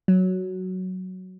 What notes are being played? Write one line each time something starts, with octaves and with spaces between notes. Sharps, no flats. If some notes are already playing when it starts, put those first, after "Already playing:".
F#3